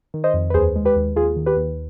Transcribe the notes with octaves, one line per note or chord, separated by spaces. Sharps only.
D#3
C5 D#5
F2
B4
D#2 G#4 C5
G#3
G4 B4
D#2
D#2 F4 G#4
D#3
G4 B4
D#2